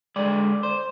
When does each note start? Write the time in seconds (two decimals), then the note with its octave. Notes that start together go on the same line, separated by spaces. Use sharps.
0.16 D3 G#3 D5
0.63 C5